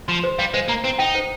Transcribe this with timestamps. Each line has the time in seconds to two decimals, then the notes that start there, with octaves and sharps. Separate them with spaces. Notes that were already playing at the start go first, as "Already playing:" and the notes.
0.08 F3 C6
0.24 C5
0.39 G3 F5
0.54 G#3 C5
0.68 A#3 A#5
0.84 C4 C5
0.99 D#4 G5
1.15 C5